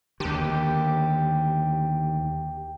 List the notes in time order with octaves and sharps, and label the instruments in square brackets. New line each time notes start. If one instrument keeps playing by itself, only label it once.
[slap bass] D#2 D3 [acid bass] G4